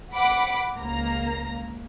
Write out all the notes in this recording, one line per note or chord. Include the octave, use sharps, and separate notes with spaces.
F#5 B5 D6
C#2 A#3 A#5